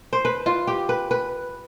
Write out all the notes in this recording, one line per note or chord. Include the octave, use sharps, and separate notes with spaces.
C5
B4
F4
G4
B4
B4